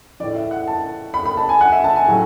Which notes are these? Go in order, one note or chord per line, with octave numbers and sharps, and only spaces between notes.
A2 E3 D5
E5
F#5
A5
B5
B5
A5
G#5
F#5
E5
A5
G#5
A2 F#3